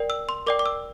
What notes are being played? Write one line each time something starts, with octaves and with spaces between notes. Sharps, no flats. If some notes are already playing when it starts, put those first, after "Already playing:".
Already playing: A#4 D5 G5
E6
C6
A#4 D5 G5 D6
D6
E6